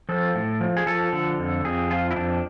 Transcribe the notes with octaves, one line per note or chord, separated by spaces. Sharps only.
F3 A4
A2
F3
G#4
F3 A4
D3
F2
F2 G#4
F3 F4
E4
F2 D4